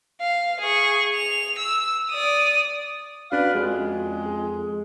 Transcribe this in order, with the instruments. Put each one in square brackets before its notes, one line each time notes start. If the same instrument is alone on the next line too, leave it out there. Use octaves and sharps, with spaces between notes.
[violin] F5
G#4 C#6
F7
E6
D5 D#6
[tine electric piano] C#4 F#4 [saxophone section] D4 B4 F5
[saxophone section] F2 G#3
[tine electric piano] G#4